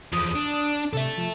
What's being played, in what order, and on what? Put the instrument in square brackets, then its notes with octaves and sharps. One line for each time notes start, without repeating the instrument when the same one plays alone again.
[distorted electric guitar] E2 F3 [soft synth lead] D#6
[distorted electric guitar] D4
[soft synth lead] C3 [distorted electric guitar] A4 E5
[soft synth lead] F3